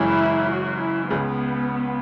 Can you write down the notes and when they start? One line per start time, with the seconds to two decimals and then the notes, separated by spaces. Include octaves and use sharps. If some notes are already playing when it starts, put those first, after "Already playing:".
Already playing: F#1 F#2 E3 G#3 E4
0.51 F#4
0.81 E4
1.10 C#2 C#3 G#3 B3